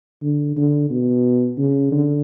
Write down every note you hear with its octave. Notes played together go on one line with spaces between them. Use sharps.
D3
D3
B2
C#3
D3